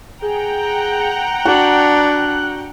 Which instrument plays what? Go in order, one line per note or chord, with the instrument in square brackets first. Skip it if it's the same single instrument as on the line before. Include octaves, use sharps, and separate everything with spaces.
[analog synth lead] G#4 [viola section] F#5 G5 A#5
[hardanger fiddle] D4 [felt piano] F#4 [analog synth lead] F#6